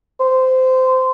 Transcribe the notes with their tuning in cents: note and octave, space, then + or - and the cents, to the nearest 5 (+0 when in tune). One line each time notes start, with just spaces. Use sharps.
C5 -20